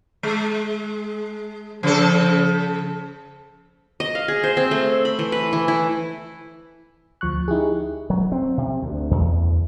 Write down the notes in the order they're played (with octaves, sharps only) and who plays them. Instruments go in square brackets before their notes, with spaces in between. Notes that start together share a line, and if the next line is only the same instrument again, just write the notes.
[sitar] G#3
[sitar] C#3 A4 [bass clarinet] F3
[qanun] D#5
F5
G#4
C5
C4
A3
B5
E3
B4
E3
E4
[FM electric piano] D2 F3 C#6 F#6
D#4 E4 G4 G#4
[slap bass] F#3
C4
C3
D2
E2